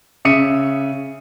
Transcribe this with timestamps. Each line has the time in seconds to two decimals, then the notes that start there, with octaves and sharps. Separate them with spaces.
0.25 C#3 E5 D#6 C#7 D#7